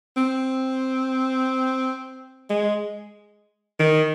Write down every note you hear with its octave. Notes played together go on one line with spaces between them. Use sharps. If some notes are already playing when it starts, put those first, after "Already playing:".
C4
G#3
D#3